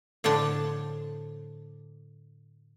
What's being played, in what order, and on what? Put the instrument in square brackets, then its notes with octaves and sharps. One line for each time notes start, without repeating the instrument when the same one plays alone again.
[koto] A2 D3 F3 D4 A5